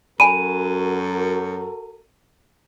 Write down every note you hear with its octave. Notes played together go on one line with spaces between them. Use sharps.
F#2 F#4 A4 A#4 G#5 B5 D#7